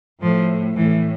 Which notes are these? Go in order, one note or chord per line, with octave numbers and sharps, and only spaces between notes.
A2 F3
A2 E3